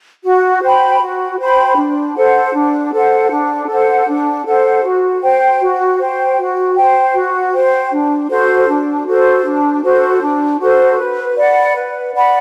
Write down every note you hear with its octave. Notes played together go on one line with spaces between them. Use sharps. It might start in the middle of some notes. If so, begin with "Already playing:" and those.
F#4
C5 G5 B5
F#4
C5 G5 B5
D4
A4 C5 F#5
D4
A4 C5 F#5
D4
A4 C5 F#5
D4
A4 C5 F#5
F#4
C5 G5
F#4
C5 G5
F#4
C5 G5
F#4
C5 G5
D4
F#4 A4 C5
D4
F#4 A4 C5
D4
F#4 A4 C5
D4
F#4 A4 C5
B4
D5 F#5 B5
B4
D5 F#5 B5